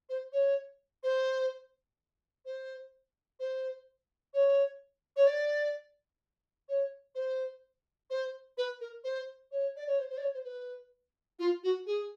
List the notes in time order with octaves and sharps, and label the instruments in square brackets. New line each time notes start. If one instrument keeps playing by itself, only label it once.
[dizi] C5
C#5
C5
C5
C5
C#5
C#5
D5
C#5
C5
C5
B4
A#4
C5
C#5
D5
C#5
C5
C5
D5
C#5
C5
B4
F4
F#4
G#4